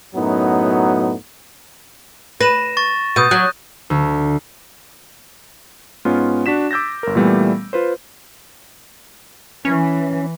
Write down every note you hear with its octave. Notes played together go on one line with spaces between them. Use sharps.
F#2 A2 F#3 B3 D#4
B4 A#6 D#7 E7
C#6 A6
B2 D#6 G6 D#7
F#3 F#6
D2
G#2 B3 C#4 F4
D4 F#4 B6 E7
D6 E6 G6 A6 A#6
G1 A#4
A#2 E3 G3 A3 B3
F4 B4 C5
E3 C#4